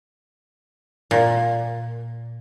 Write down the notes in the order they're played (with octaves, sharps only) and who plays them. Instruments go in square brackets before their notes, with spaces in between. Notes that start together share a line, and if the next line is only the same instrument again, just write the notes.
[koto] A#2